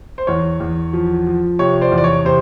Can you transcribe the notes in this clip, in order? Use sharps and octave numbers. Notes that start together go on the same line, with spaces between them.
C5
E2 C#5
E2
F3
F3
C3 C#5
C5 D5
E2
D5
C#5
C3 C5